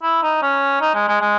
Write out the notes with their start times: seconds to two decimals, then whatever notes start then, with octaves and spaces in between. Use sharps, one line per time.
0.03 E4
0.23 D#4
0.42 C#4
0.81 D#4
0.94 G#3
1.08 G#3
1.21 G#3